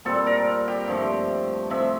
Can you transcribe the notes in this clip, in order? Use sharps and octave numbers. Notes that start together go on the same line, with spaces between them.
A#2 G3 C4 A4
A#4
G4
G2 F3 A3
C3 F3 A3 E5